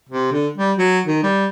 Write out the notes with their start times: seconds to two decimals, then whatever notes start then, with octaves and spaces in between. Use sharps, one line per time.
0.09 C3
0.32 D3
0.58 G3
0.78 F#3
1.07 D#3
1.23 G3